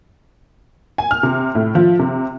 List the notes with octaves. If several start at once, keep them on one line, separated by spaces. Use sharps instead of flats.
G#5
F6
C3
A2
F3
C3